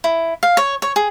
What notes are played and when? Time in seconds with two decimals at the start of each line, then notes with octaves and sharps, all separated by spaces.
0.04 E4
0.43 F5
0.57 C#5
0.82 C#5
0.96 G#4